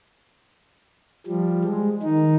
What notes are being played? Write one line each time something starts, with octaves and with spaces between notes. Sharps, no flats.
F3 G3
G#3
D#3 D#4